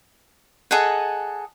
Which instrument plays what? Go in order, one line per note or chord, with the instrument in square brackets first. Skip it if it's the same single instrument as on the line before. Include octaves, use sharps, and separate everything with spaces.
[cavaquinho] G#4 A4 D#5 F#5